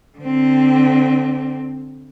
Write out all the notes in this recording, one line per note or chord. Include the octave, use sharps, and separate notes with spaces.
D3 C4